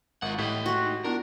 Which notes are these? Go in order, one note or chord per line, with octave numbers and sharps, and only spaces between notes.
G#1 G#3 F4 A#4 F#5
A2 G4 D#5
F#4 C6
D#4
B3 D4 E4 F4 A#4